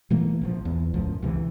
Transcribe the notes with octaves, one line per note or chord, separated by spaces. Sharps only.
A#2 E3 A3 A#3
A#1 C#3 F3
E2
C#2 F#2 A2 F3
C#2 C3 E3